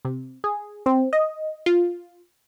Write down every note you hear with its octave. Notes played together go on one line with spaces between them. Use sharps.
C3
G#4
C4
D#5
F4